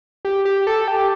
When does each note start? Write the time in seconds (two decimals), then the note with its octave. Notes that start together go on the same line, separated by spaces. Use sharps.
0.25 G4
0.45 G4
0.67 A4
0.88 G4